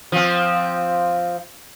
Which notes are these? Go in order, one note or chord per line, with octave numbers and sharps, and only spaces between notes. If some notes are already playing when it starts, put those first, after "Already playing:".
F3 C4